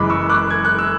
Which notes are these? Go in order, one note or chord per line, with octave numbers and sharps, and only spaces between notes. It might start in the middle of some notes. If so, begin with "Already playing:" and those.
Already playing: F#1 F#2 E3 G#3 B5 D6
C#6 E6
D6 F#6
G#6
F#6
E6